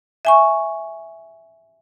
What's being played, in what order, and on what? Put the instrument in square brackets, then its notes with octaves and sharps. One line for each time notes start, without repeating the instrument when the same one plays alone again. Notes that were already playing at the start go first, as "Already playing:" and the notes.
[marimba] E5 G#5 C#6